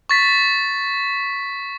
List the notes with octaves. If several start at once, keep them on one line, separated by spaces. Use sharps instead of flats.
C#6 A6 B6